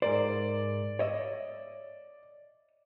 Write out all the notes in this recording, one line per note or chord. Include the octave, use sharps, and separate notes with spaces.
G#2 A#4 C5 D5
C#5 D#5 E5